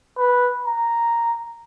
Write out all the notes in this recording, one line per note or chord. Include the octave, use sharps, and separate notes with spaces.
B4
A#5